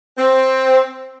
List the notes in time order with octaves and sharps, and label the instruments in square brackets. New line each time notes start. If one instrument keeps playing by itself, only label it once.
[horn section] C4